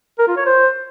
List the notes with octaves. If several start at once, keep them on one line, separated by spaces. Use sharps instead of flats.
A#4
F4
C#5
C5